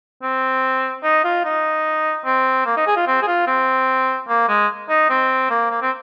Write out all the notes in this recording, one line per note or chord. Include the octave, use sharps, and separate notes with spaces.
C4
D#4
F4
D#4
C4
A#3
D#4
G#4
F4
C4
G#4
F4
C4
A#3
G#3
D#4
C4
A#3
A#3
C4